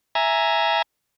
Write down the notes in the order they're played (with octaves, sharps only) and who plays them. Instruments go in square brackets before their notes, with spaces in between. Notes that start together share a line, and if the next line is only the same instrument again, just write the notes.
[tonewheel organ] E5 G#5 A#5